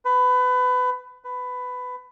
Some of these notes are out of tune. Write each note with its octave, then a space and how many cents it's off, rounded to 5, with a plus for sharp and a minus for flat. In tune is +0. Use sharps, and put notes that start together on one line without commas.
B4 +25
B4 +15